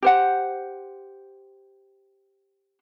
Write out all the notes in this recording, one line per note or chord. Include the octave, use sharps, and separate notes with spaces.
G4 C5 F#5